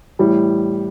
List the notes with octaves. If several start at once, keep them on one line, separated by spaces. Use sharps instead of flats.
A2 E3 G3